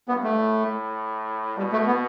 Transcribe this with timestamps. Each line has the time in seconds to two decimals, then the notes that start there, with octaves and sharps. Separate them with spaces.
0.08 G2 B3
0.23 A3
0.38 A2
1.57 B2 G3
1.73 A3
1.87 B3